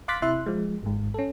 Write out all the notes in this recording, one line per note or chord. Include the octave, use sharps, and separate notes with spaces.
F5 C6 D6 F#6 A6 B6
C3 E4 E5 C6 F#6
F3 G#3
G#1 G#2
C#4 A4